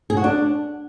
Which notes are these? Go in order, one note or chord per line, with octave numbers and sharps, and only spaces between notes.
G#4
F#4
D4